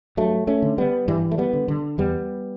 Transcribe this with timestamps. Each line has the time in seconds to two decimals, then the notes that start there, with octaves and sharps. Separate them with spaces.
0.17 G2 F#3 A3
0.47 A3 C#4
0.62 D3
0.78 G3 B3
1.08 G2 E3 G3
1.31 A3
1.38 G3 B3
1.53 D3
1.68 D3
1.98 E2 G3 B3